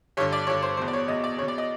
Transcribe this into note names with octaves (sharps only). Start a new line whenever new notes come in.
G2 D3 C#5
D5
G2 D3 C#5
C5
E2 B2 C5
D5
C#5
E2 B2 D#5
D5
E2 B2 C#5
D5
D#5